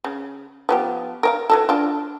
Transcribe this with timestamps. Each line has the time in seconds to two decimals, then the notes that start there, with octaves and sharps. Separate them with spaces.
0.04 C#3
0.69 F3 B3 G4
1.23 A#4 C#5 F5
1.50 E3 F#4 A4
1.69 D4 F4